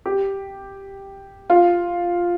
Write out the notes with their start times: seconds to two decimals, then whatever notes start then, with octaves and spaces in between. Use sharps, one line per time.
0.06 G4
1.50 F4